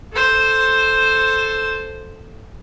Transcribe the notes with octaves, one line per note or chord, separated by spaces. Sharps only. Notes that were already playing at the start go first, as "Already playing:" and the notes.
A4 C5